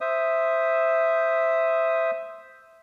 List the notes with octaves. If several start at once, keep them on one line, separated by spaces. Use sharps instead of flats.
C5 E5 D#6